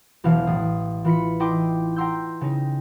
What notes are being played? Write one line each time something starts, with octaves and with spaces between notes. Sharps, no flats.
E1 B1 E3 F5
A1 D#6 C7
E3 F4 B5 B6 C#7
D#4 E4 D#5 G5 C6 D6
G5 A#5 C6 E6 G6
C#3 D#4